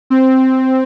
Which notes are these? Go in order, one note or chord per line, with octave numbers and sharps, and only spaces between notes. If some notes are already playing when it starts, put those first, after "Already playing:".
C4